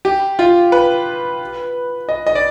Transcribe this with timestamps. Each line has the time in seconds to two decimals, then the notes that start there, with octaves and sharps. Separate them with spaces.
0.05 G4
0.39 F4
0.72 B4
2.09 D#5
2.27 D#5
2.35 D5